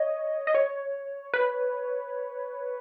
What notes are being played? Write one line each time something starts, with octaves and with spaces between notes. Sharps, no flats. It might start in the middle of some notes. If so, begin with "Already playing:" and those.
Already playing: C#5 D#5
D#5
C#5
B4